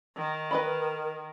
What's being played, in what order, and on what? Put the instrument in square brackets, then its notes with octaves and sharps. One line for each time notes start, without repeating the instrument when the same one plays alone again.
[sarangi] D#3
[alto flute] A#4 [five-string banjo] B4 D#5 B5